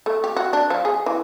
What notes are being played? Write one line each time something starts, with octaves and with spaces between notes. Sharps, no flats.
A3
G4
F#4
D4
F3
G#4
E3